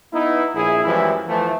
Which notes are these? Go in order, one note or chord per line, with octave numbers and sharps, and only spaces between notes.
B3 D#4 E4
A#1 E4 G#4
F#2 E3 F3 G3 G#3 E4
E2 E3 F3 A3